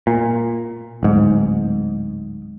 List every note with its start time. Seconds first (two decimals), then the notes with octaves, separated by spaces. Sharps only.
0.07 A#2
1.03 D1 G#2